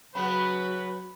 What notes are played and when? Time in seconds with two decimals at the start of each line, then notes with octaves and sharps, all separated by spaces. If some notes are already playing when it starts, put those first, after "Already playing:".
0.15 C#3 F#3 B3 B4 B5